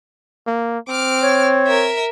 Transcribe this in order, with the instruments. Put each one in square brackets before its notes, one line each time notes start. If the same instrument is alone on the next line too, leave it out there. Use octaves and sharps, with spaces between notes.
[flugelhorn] A#3
[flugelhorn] C4 [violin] D6 F6
[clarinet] C#5
[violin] A#4 E5